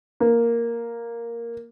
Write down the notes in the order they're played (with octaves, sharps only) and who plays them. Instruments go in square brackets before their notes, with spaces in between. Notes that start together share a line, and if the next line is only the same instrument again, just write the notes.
[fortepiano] A#3